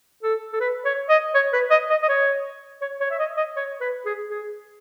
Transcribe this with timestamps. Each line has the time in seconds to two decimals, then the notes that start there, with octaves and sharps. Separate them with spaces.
0.23 A4
0.53 A4
0.60 B4
0.85 C#5
1.09 D#5
1.35 C#5
1.53 B4
1.71 D#5
1.90 D#5
2.03 D#5
2.09 C#5
2.82 C#5
3.01 C#5
3.11 E5
3.19 D#5
3.38 D#5
3.56 C#5
3.81 B4
4.06 G#4
4.30 G#4